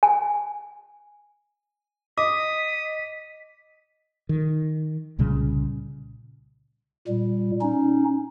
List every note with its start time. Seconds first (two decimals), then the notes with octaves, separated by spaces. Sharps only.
0.03 G#5
2.18 D#5 D6 D#6 B6
4.29 D#3
5.19 C2 A#2 C#3 G3
7.08 A#2 G3
7.61 C#4 D#4